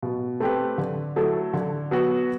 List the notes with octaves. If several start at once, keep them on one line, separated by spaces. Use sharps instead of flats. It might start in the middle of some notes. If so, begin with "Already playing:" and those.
B2
A3 C4 G4 B4
D3
F#3 A3 E4 A4
D3
F#3 B3 F#4